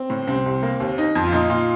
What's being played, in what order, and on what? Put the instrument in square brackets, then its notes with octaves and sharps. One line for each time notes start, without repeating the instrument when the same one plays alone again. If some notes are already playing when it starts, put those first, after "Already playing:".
Already playing: [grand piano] C4
[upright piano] A2
[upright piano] C2 [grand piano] C4
[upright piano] C2
A#3
D#2
D#4
F2
[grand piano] F4
[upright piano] A#2 [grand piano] D#4
[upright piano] A#2 [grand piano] F4